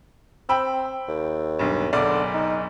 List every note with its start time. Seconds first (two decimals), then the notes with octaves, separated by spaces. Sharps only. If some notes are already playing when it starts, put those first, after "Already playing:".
0.49 C4 G5 B5 E6
1.08 D#2
1.59 B1 G2
1.93 F#1 B1 D3 D5
2.34 D#4